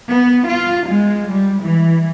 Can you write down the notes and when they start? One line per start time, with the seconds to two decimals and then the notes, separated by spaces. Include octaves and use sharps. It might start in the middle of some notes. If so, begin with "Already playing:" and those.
0.10 B3
0.49 F4
0.90 G#3
1.31 G3
1.64 E3